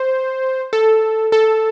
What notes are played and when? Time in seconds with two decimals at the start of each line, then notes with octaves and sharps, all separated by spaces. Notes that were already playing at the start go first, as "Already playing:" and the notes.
Already playing: C5
0.73 A4
1.32 A4